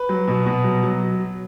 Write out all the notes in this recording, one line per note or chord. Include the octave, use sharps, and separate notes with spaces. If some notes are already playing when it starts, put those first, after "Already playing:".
Already playing: B4
F#3
B2
B2
F#3
F#3